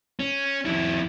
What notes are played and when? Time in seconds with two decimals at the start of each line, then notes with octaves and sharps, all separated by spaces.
0.20 C#4
0.65 F2 E4